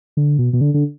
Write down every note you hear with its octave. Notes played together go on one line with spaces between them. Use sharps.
D3
B2
B2
D3
D3